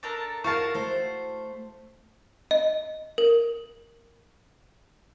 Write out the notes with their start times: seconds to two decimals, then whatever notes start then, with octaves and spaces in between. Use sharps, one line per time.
0.03 D4 A4 A#4
0.44 E4 F#4 A#4 F5 A5
0.74 A3 C5
2.51 D#5
3.18 A#4